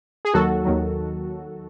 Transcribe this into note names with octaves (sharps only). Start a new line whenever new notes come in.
G#4
D#2 D#3 F#3 F#4 A4
D#2 D#3 F#3